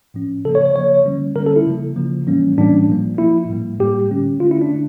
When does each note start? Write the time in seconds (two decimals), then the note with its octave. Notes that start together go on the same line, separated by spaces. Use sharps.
0.14 A2 F3 C#4
0.45 C#3 F3 A#3 A4
0.55 C#5
0.66 C#5
0.76 C#3 F3 A#3 C#5
1.05 D3 G3 A#3 C#4
1.35 D3 G3 A#3 C#4 A#4
1.46 A4
1.56 E4
1.66 C#3 F3 A#3
1.96 C#3 F3 A#3
2.27 A2 E3 G3 A#3 C#4
2.57 A2 E3 G3 A#3 C#4 D4
2.89 A#2 F3 A#3
3.18 A#2 F3 A#3 E4
3.50 A2 G3 A#3
3.79 A2 G3 A#3 G4
4.10 D3 A3 C#4
4.40 D3 A3 C#4 F4
4.51 E4
4.61 D4
4.71 D3 A3